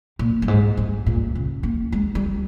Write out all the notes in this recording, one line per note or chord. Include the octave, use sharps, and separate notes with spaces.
A#2
G2
G#2
G2
A#2
C#3
A#3
G#3
G3